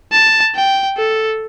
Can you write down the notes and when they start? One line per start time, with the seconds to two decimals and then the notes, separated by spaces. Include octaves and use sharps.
0.12 A5
0.55 G5
0.97 A4